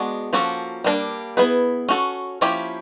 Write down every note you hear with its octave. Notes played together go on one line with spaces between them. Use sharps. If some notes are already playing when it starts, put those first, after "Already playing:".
Already playing: G#3 B3 D4 F#4
F3 A#3 C#4 F#4 A4
G3 A#3 D4
B3 E4 G#4 B4
C#4 F#4 A4
F3 A#3 C#4 E4 G4